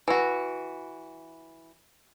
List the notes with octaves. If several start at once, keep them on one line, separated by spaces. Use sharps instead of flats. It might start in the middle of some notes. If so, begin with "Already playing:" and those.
E3 F#4